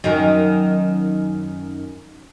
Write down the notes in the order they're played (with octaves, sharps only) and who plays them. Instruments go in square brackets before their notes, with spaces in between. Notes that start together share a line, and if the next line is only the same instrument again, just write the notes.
[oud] F#2 D#3